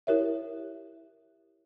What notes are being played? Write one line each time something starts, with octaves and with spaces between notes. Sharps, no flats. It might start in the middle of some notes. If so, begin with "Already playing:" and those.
E4 G4 A#4 C#5 E5